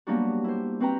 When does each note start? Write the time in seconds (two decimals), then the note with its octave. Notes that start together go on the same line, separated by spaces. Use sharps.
0.07 F#3 G3 A#3 B3 D4 F#4
0.44 E4 C5
0.80 C4 F#4 B4 G5 A#5